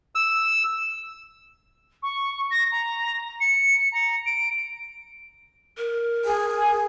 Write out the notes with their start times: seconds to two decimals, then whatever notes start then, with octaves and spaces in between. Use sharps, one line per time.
0.15 E6
2.03 C#6
2.51 A#6
2.72 A#5
3.40 C#7
3.92 A#5
4.26 D7
5.78 A#4
6.25 G#4